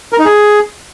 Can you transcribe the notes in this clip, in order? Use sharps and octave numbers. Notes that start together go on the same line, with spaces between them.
A#4
D#4
G#4